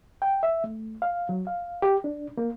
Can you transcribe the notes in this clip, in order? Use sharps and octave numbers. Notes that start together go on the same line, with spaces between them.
G5
E5
A3
F5
F#3
F5
G4
D4
A#3